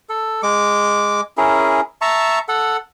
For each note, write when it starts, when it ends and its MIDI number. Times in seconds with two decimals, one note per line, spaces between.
0.09 0.41 69
0.43 1.21 56
0.43 1.21 86
1.37 1.81 61
1.37 1.81 64
1.37 1.81 68
1.37 1.81 70
2.01 2.39 76
2.01 2.39 81
2.01 2.39 82
2.01 2.39 85
2.48 2.77 69
2.48 2.77 78